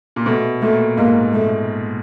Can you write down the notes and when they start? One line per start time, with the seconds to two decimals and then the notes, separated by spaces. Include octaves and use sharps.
0.16 A#2
0.26 B2 A3
0.62 A#2 A3
0.97 G#2 A#3
1.33 A3